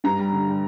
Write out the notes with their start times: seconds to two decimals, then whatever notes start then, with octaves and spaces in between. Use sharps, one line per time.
0.04 G2 A#5
0.19 G3
0.33 D3
0.48 G3